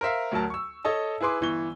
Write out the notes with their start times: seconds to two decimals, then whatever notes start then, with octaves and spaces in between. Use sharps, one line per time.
0.01 A#4 C5 E5 F5
0.32 D2 F#3 A#4 A5
0.50 C#6 E6
0.85 A4 C#5 D#5 A5
1.21 E4 G#4 B4 C6 D6
1.41 G1 E3 C#6 G7